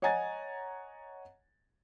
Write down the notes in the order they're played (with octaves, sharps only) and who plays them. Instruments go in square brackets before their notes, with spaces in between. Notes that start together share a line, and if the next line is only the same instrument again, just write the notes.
[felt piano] C#5 D#5 F#5 G#5 A#5 A6